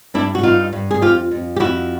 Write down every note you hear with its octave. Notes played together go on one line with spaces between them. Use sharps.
G2 D4 E4
F#4
G2 D#4 F4
G2
G#4
F2 F4 G4
F2
G4
F2 E4 F#4